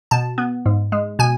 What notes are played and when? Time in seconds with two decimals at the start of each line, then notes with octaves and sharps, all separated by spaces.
0.11 B2 A5
0.38 B3
0.66 G#2
0.92 G#3
1.19 B2 G#5